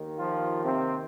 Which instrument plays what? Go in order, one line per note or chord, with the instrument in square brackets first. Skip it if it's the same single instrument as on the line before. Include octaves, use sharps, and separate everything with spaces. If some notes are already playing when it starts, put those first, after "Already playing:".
Already playing: [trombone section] D#2 D#3
F3 F4
C3 C4